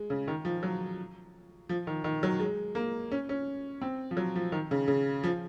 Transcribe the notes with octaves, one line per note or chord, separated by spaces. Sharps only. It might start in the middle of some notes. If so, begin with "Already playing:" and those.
Already playing: G#3
C#3
D#3
F3
F#3
F3
D#3
D#3
F#3
G#3
A#3
C#4
C#4
C4
F3
F#3
F3
D#3
C#3
C#3
F3